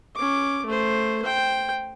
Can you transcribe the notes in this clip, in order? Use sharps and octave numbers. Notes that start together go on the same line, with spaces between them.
C#4 D6
A3 C5
C5 G5